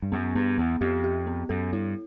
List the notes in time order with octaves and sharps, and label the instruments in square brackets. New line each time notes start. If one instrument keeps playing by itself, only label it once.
[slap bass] G2
[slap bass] F#2 [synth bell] B3
[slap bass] G2 [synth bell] B3
[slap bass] E2 [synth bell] B3
[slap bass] F2 [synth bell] G4
[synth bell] G4
B3
[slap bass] F#2 [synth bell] A4
[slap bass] G2 [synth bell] E4